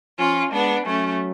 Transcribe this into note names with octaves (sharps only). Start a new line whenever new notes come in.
F3 C#4 F4
G#3 B3 D4
F#3 A3 C#4